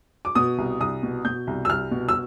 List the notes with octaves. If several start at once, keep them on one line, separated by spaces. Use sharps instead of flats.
D6
B2 D#6
C2
C2 D#6
B2
B2 G6
C2
E6
C2 F6
B2
E6